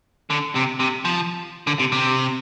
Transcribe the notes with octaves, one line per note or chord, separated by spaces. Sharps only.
D3
C3
C3
F3
D3
C3
C3